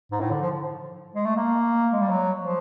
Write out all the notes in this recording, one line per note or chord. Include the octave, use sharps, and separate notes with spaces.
G#2
A2
D3
F3
G#3
A3
A#3
G#3
G3
F#3
F3